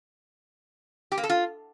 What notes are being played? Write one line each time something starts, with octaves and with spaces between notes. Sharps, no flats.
G4
A#3
A4
F4